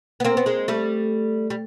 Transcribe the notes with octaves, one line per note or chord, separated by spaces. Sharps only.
B3
A#3 C4
B3
G#3 A#3
G3 A3
G3